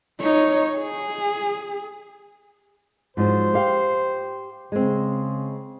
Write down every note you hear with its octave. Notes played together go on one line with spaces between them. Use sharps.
D#4 C#5
G#4
G#2 F3 F#3 C5
G4 F5 G5
C#3 G#3 C4